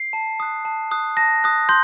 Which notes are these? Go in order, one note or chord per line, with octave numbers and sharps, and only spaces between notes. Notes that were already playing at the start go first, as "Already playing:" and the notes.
Already playing: C7
A5
D#6 F#6
A5
D#6 F#6
A5 A#6
D#6 F#6
C6 G6